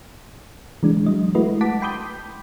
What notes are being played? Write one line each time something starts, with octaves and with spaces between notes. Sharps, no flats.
E3 G#3 D4
F#3 D#5
G#3 A3 E4 F#4 B4 D#5
F#5 A5 D6 B6
G5 B5 C6 D6 D#6 G6